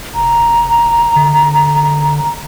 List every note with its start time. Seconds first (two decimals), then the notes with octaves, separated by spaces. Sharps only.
0.15 F1 A#5
1.16 D3